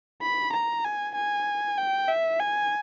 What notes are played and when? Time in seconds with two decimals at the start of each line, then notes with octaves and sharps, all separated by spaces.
0.22 B5
0.53 A#5
0.84 G#5
1.15 G#5
1.78 G5
2.08 E5
2.40 G#5